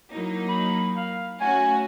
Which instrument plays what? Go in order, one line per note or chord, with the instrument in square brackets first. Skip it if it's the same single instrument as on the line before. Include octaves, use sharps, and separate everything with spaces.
[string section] F#3 A#3 D#4 [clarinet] E4
[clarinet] B5
F5
[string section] A3 C#4 F#4 [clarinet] G#5